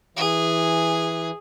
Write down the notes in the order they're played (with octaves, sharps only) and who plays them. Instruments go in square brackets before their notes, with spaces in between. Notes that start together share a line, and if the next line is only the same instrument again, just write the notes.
[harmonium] E3 [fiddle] G#4